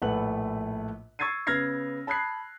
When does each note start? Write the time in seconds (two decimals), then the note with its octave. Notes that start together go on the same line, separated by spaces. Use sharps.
0.02 A#1 A2 A3 B4 F#5 F#7
1.19 C#6 E6 G#6 A6 C7 D#7
1.47 C#3 B3 F6 G#6 A#6 C7
2.07 A5 B5 D#6 F#6 G#6 C7